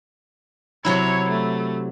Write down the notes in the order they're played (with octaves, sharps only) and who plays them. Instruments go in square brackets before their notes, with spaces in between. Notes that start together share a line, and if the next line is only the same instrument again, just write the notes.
[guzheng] C3 F#3 E4 [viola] C#5
[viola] A3